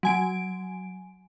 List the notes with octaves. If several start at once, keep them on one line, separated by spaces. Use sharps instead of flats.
F#3 G#5 D7